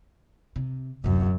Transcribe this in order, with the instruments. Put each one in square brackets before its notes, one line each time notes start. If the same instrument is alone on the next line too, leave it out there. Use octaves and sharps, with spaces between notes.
[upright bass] C3
[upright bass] D1 C3 [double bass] F#2